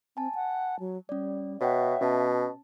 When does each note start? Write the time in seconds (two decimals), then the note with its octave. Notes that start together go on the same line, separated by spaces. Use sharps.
0.17 C4 G#5 A5
0.35 F#5
0.80 F#3
1.09 G3 C#4 D5
1.61 B2 C#5 E5 F#5 G5
2.01 B2 C#4 A5